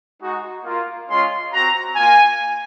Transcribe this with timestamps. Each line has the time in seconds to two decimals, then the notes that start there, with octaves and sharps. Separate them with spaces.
0.20 G#3 D#4 F#4
0.65 A#3 F4
1.09 G#3 C#4 F4 C6
1.52 C4 F#4 A#5
1.96 A#3 F4 G#5